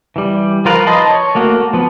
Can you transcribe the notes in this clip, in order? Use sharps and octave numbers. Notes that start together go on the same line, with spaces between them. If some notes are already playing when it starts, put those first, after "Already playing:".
E3 G3
F3 F4 A#4 B4
D#4 B4 D#5 A5 C6
C#5
A3 A#3 F#4
F3 B3